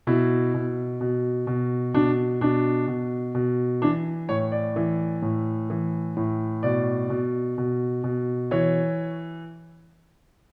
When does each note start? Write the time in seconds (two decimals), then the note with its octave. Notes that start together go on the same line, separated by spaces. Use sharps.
0.07 B2 E4
0.54 B2
1.01 B2
1.47 B2
1.94 B2 D4
2.41 B2 D4
2.88 B2
3.35 B2
3.82 E3 D4
4.29 A2 C#5
4.52 D5
4.76 E3
5.22 A2
5.70 E3
6.17 A2
6.63 B2 D5
7.10 B2
7.58 B2
8.04 B2
8.51 E3 C#5